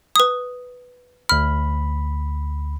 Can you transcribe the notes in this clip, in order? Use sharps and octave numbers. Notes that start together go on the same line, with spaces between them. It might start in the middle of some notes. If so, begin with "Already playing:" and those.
B4 D#6
D2 B5 F6